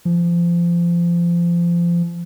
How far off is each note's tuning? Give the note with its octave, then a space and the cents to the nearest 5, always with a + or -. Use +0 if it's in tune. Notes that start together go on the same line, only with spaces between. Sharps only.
F3 -25